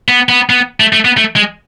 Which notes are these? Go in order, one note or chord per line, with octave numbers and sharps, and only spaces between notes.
B3
B3
B3
A3
A3
B3
A3
G#3